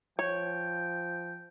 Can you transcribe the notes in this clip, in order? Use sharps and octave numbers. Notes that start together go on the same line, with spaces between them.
F3 C#5 G5